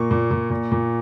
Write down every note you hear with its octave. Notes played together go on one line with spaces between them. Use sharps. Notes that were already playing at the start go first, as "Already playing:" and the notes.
Already playing: A#2 A#3 C#6
A#2
A#2
A#2
A#2